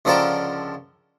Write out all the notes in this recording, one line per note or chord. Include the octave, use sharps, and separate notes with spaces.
C#2 D3 F3 A#4 G5 A5